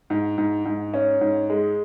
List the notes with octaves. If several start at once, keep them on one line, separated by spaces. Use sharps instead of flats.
G#2
G#2
G#2
C#4
G#2
G#3